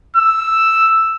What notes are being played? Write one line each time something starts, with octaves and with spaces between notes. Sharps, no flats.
E6